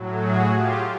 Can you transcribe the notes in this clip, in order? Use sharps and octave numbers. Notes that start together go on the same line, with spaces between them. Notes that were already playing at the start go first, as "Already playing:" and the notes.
Already playing: A2 F#3
F#4 G#4
F4 G4